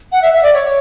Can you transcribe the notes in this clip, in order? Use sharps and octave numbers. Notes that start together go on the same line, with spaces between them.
F#5
E5
E5
D5
C#5